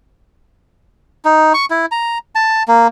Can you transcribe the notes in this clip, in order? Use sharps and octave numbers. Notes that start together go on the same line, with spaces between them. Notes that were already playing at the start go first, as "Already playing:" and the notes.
D#4
C#6
E4
A#5
A5
A#3